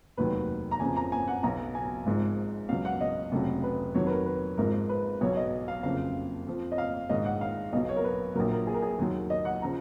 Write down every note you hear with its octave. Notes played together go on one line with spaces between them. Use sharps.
F1 D#2 D#3 F#3 B4
A#5
F#1 F2 C#3 F3 G#5
A#5
G#5
F#5
B1 B2 F#3 A#5
G#5
G#1 G#2 F3
C#2 B2 F#3 F5
F#5
D#5
F1 F2 C#3 F#3
B4
F2 D#3 F#3 C#5
B4
A#4
B4
G#1 G#2 F3 A#4
B4
B1 B2 F#3 C#5
D#5
F5
F#1 F2 C#3 F3 F5
F2 F3
D#5
F5
A#1 G#2 D#3 D#5
F#5
F5
B1 B2 F#3 D#5
C#5
A#4
B4
A#1 A#2 F#3 A#4
A#4
G#4
A#4
G#4
D#2 D#3 F#3
D#5
F#5
C#3 F3 A#5